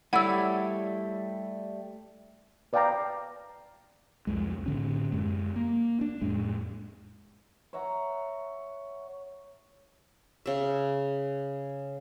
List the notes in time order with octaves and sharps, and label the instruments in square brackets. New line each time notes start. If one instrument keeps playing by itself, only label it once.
[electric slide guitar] G3 A3 [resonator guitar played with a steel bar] E4 C#5 D5 [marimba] F#5 E6
[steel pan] B4 D5 F5 G5 A5 A#5
[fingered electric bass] C2 F2 G#3
A2 D3 C#4
F#2 G#3
A#3
D4
F2 A2 G#3
[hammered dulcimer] C#5 E5 F#5 A#5
[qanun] C#3 E5